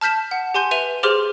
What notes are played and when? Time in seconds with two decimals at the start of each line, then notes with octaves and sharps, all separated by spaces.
0.01 A5 F6 G6 B6 E7
0.31 F#5
0.54 G4 G#5 C6 G6
0.71 B4 E5 D#7 F7
1.03 G4 G#4 C5 C6 D6 F6